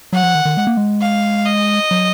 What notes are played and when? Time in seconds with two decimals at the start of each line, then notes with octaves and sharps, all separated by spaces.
0.13 F#3 F#5
0.23 F3
0.35 D#3
0.45 D#3
0.57 G#3
0.67 A#3
0.77 G#3
1.01 F5
1.46 D#5
1.91 F#3